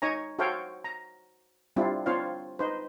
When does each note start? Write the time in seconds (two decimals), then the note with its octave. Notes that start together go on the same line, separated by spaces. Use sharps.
0.02 D#4 C#5 G#5 A#5
0.39 F#4 A4 C5 C#5 F5 G5
0.84 A#5
1.76 G3 C4 D4 E4 F4
2.06 C4 D4 F4 C5 C#5 F5
2.59 D#4 B4 C5